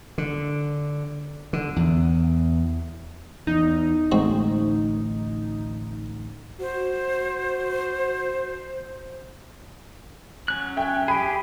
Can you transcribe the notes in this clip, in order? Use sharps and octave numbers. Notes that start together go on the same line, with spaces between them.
D3
D3
E2
E2 D#4
A1 D2 A2 G#3 C4 F#4
F#4 C5
F#3 C#4 F#6
E5 G5
G4 G#4 B5